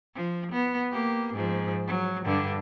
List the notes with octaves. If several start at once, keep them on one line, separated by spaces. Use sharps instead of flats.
F3
B3
A#3 G4
G#2 F3
F#3
G2 D3